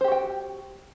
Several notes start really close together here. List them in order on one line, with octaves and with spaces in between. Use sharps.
C5 G4 F#4 G5